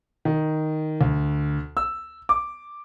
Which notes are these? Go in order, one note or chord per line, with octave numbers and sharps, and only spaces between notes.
D#3
D2
E6
D6